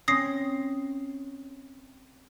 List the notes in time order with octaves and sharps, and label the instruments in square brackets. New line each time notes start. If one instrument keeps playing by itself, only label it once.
[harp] C4 C#4 [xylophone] D#6 A#6 C7